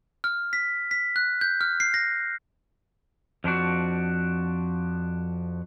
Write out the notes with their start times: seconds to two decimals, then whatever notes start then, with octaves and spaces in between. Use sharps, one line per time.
0.24 F6
0.53 B6
0.91 B6
1.16 F#6
1.41 G6
1.61 F6
1.80 C7
1.94 A#6
3.44 F2 F3 D4 F#4